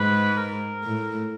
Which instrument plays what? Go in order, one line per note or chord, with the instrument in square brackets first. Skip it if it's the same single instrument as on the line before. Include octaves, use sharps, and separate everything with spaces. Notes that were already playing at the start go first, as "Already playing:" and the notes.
Already playing: [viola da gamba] G#2 [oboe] B4
[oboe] A#4
[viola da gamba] A2